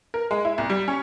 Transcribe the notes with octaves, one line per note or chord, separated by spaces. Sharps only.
A#4
G#3
E4
C2
G3
C#4